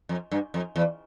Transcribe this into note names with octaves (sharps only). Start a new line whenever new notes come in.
F2
G2
F2
E2